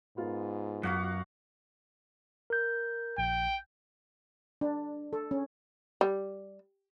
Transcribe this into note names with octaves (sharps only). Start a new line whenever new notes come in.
G#2 B3 F4 A#4
F#2 F#4 F5 F#5
A#4 G6
A#1 G5
D4
A4
C#4
G3